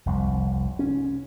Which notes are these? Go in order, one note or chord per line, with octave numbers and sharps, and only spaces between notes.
F1 C2
C#4